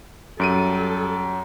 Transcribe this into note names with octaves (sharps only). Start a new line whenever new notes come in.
F#2 G3 A4 D7 D#7